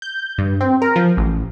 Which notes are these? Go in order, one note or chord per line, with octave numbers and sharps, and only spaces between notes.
G6
G2
C4
A#4
F3
A1